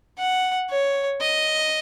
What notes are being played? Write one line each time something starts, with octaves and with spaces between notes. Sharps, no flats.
F#5
C#5
D#5